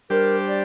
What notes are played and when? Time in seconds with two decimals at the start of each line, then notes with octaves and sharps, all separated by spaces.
0.10 G3 D4 G4 A#4 C5
0.48 D5